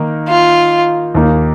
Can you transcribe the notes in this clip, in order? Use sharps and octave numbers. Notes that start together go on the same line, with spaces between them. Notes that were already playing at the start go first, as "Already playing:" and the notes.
Already playing: D#3 A#3 D#4
F4
D#2 D#3 A#3 D#4